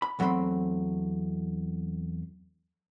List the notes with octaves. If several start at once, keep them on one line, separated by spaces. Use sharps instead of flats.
B5
E2 F#3 A3 C4 B5 C6